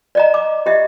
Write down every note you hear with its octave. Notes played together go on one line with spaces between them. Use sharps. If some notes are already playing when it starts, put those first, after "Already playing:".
D5 D#5 A#5
D6
G4 D#5 E5